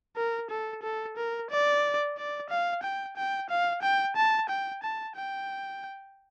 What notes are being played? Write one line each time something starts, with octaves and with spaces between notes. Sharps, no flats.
A#4
A4
A4
A#4
D5
D5
F5
G5
G5
F5
G5
A5
G5
A5
G5